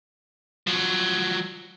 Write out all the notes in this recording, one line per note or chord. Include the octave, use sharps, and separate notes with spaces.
F3 F#3